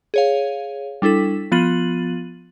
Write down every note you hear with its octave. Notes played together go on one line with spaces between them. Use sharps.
G#4 C#5 F5
G3 D4 E4 A4 B6
F3 B3 F4 A6 D#7 F#7